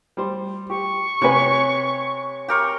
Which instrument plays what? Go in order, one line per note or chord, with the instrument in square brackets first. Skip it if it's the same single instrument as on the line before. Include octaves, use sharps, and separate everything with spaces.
[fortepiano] G3 C5
[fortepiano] G4 [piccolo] C#6
[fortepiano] C3 B4 [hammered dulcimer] C#5 G#5
[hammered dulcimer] G4 A#4 C#6